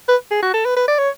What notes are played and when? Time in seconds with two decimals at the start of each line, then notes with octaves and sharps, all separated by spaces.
0.08 B4
0.31 G#4
0.42 F#4
0.54 A4
0.65 B4
0.76 B4
0.88 D5
0.98 C#5